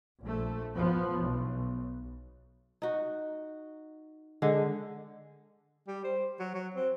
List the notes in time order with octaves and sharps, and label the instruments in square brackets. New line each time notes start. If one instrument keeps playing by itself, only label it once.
[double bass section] A#1 A3
F3 B3
B1
[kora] D#4 F#4
[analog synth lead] D3 [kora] G#3
[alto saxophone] G3
C5
F#3
F#3
C4